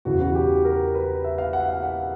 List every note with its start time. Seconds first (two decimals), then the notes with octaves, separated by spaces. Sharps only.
0.05 E2 C#3 E3 F#4
0.20 F#4
0.35 G4
0.65 A#4
0.95 B4
1.24 E5
1.38 F5
1.53 F#5
1.69 F5
1.83 F#5